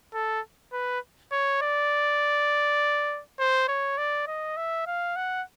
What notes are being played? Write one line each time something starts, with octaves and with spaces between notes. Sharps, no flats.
A4
B4
C#5
D5
C5
C#5
D5
D#5
E5
F5
F#5